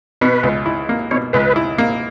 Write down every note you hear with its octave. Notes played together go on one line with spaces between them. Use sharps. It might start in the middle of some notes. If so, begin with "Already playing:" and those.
B2 B4
C#2
E4
A#3
B2 C#5
C#2 B4
E4
A#3